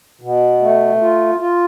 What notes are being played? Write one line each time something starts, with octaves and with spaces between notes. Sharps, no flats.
B2
A3
F4
F4